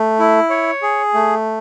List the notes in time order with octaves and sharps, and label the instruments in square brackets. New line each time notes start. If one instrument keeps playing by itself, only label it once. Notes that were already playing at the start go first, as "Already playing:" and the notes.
Already playing: [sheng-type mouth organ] A3
E4
C#5
G#4
A3